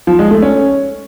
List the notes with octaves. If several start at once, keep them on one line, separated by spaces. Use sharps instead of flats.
F3
G#3
A3
C#4